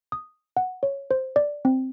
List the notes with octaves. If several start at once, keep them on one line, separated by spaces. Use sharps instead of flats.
D#6
F#5
C#5
C5
D5
C4